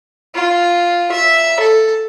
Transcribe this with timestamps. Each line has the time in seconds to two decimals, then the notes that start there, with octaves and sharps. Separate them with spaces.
0.35 F4
1.12 E5
1.60 A4